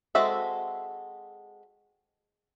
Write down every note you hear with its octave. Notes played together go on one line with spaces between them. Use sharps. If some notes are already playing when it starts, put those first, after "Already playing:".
G#3 C4 F#4 A4 E5